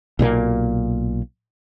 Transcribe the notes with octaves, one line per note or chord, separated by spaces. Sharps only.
B1 A#2 F#3 A#3